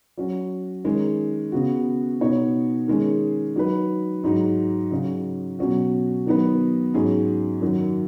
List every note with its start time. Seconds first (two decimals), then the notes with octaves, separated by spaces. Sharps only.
0.17 F#3 C#4 F#4
0.85 D#3 G#3 C#4
1.52 C#3 B3 F#4
2.20 B2 B3 D#4 F#4 C#5
2.88 D#3 G#3 C#4 G#4
3.56 F#3 D#4 B4
4.23 G#2 F#3 D#4
4.91 C#3 F#3 C#4
5.59 B2 F#3 C#4 F#4
6.26 D#3 F#3 B3 D#4 B4
6.94 G#2 F#3 C#4 G#4
7.62 F#2 D#3 F#3